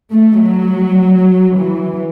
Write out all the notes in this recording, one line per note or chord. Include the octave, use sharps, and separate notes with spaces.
A3
F#3
E3